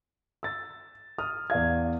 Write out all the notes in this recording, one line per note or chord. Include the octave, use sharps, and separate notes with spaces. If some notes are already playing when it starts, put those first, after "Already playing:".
E6 A6
D#6 F6
E2 D5 F5 G#6